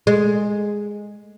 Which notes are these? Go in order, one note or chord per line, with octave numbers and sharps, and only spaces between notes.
G#3